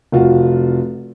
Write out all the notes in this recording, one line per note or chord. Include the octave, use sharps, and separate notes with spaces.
F1 F4 F#4